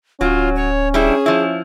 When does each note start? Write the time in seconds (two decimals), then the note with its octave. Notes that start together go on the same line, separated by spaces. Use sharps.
0.21 D1 F#3 C#4 F4
0.56 C#5
0.94 G3 D4 E4 G#4
1.26 F3 E4